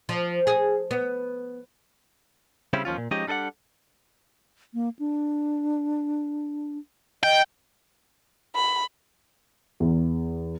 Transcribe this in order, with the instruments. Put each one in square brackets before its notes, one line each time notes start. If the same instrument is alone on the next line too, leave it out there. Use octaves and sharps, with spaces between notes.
[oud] F3
G#4
B3
[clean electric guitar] C#3 G3 C4 C#4 E4
D#2 F3 C#4 F4
A#2
F3 G#3 C#4 D#4 G4 D#5
G3 D4 A4 D#5 F#5
[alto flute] A#3
D4
[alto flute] D#5 [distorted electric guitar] G5
[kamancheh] B5
[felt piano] E2